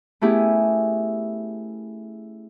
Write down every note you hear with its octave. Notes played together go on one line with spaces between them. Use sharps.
A3 B3 C#4 E4 G4 G#4